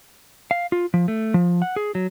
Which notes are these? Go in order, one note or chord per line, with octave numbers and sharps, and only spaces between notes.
F5
F4
F3
A3
F3
F#5
G#4
F#3